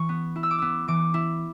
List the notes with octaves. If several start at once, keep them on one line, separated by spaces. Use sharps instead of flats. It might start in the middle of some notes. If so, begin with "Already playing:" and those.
Already playing: E3 C#6
B3
E4
E6
D6
B3 E6
E3 D6
E4